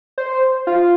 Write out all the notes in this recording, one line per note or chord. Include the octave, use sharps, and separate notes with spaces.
C5
F4